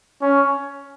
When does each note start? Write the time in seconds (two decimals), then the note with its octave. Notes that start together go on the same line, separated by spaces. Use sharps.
0.22 C#4